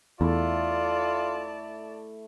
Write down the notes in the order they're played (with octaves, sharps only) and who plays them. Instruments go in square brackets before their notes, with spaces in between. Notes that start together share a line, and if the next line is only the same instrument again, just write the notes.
[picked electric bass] E2 [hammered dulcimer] A3 E4 [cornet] F4 [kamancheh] D5 A5